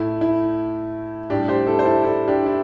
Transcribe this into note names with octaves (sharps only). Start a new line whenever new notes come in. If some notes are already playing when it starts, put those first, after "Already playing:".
Already playing: A2 A3 E4
E4
A2 G3 D4 G4
G4 C5
E4 A4
C5
E4 A4
E4 A4
D4 G4
E4